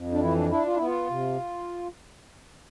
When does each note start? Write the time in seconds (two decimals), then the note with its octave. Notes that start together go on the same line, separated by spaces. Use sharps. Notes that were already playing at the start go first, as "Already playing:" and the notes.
Already playing: F2
0.12 D4
0.20 E3 E4
0.36 D4
0.50 D4 E4
0.65 F4
0.76 B3 E4
0.86 F4
1.09 C3